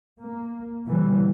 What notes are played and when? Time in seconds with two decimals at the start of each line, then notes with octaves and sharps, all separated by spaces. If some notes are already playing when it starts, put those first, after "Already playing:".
0.20 A#3
0.87 B2 D3 E3 G3